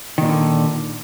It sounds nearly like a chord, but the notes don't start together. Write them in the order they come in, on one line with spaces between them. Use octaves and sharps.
D#3 A#2 F3 D3